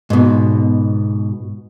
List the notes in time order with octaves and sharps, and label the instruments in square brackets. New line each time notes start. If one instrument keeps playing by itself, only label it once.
[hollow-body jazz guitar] G#2 B2